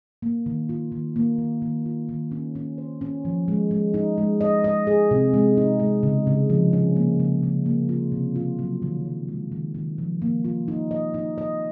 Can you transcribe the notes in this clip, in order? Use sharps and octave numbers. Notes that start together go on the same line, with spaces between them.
A#3
D#3
F4
D#3
A#3
D#3
D#3
F4
D#3
C#4
C#4
C5
C#4
F3
G#3
G#3
D#4
G#3
D#5
D#5
G#4
C3
G#3
D#4
G#3
C#3
C#3
F3
C#4
A#3
C#3
C#3
A#3
F4
C3
F4
F#3
D#3
F#3
G#3
D#3
D#3
F3
A#3
F4
D#4
D#5
D#4
D#5